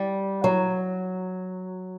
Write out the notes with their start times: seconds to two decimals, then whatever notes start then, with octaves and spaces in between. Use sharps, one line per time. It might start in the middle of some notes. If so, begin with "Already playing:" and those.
Already playing: G3
0.44 F#3